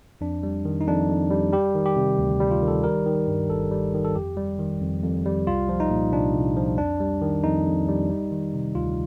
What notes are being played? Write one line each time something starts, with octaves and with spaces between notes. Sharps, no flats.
F2 D4
G3
D#3
D#4
F2 D4
F2
G3
G3 G4
D#3
G4
C3
D2
G3
F4
D#3
A4
G3 A#4
D#3
G2
G1 A4
G3
D#3
A4
F2 G4
G3
D#3
F2
F2
G3
C2 F4
F3
D#4
A#2
C2 D4
C2
F3
F2 D4
G3
D#3
F2 D#4
F2
G3
G3
D#3
C3
D2 F4